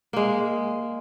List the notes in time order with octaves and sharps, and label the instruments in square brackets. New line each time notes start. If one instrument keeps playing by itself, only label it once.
[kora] G#3 A#3